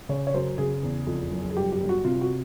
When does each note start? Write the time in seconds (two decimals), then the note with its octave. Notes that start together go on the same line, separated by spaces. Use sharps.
0.09 C#3 C#5
0.27 C#5
0.34 F#2 C5
0.58 C#3 G#4
0.83 E2
1.07 F2
1.31 F#1
1.50 G#4
1.57 G2 G4
1.72 G4
1.80 G1
1.89 F#4
2.04 C3 F4
2.21 F#4